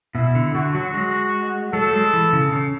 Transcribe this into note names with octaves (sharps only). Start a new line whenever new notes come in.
B2 E4
D3
D3 F#4
F#3
G#3
F#3 A4
A3
G#3
E3
C#3
C#3